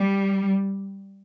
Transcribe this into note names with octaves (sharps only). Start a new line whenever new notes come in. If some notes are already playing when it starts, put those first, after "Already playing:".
Already playing: G3